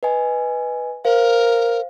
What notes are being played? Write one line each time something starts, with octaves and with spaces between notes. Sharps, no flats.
B4 D#5 G#5
A#4 C5 F5